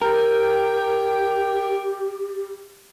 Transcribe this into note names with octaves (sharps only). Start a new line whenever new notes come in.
G4 A#4 G5